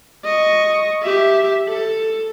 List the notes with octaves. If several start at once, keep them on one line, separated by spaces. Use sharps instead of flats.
D#5 C#6
G4 E5
A4